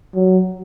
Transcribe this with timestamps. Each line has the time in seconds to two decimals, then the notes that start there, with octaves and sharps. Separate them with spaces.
0.15 F#3